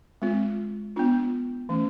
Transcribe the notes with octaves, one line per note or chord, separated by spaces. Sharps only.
G#3 C4 F4
B3 D4 F4
E3 A3 C#4